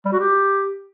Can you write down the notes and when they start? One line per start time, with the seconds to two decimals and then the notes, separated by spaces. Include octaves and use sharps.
0.05 G3
0.12 F#4
0.19 G4